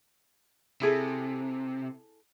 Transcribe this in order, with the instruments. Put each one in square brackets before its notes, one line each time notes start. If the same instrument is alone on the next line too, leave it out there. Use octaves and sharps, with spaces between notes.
[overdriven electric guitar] C3 [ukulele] E4 G#4 A4